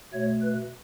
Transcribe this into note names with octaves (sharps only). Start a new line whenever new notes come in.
B2 A3 C#5
B4